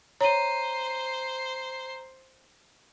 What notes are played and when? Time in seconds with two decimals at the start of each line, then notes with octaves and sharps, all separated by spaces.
0.21 C5 C#5 A#5 D#7